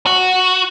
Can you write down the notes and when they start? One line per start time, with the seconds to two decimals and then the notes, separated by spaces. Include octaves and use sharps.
0.07 F#4